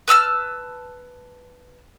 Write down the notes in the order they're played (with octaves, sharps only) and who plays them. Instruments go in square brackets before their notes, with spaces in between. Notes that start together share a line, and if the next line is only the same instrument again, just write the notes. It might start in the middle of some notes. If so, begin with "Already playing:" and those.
[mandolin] B4 A5 E6 F6